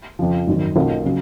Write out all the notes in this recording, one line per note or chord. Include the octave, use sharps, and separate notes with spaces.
F2 C#3 F3
G#1 F#2 D#3
B1 B2 A#3 C#4 F4
C#3 F#3